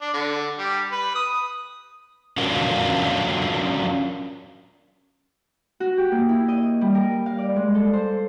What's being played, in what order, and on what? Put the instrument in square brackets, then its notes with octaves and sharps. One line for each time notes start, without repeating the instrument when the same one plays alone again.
[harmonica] D4
D3
G3
B4
D#6
[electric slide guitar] C#4 D4 F4 F#4 A#4
[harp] F#4
G4
A#3
E4
D#5
G3
A#4
F5
D5
G#3
A4
C5